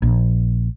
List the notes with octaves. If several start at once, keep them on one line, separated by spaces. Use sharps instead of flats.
A#1